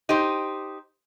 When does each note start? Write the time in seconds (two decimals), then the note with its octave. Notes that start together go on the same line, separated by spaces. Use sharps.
0.09 D#4 G4 C5